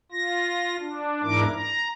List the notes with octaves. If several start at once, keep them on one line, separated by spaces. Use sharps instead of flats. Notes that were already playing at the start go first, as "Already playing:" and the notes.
F4 A#6
D4
E2 G#2 D4 E4 A#4 D6
A#5